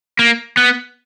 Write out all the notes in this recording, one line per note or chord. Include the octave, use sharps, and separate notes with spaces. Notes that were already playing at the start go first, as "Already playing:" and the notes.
A#3
B3